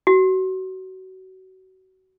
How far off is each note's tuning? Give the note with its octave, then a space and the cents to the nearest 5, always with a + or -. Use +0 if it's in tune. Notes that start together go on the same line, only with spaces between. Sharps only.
F#4 +25